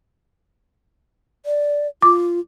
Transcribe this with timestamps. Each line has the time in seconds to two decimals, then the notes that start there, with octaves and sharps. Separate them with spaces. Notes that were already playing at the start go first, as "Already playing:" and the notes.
1.46 D5
2.02 F4 D6